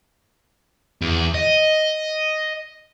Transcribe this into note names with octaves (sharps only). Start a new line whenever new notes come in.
E2
D#5